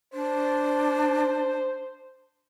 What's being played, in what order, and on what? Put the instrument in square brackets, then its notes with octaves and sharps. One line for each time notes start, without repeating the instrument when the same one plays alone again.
[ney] D4 [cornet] C5